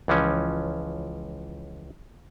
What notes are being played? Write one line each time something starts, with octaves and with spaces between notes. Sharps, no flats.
C#2 E3 F3 C#4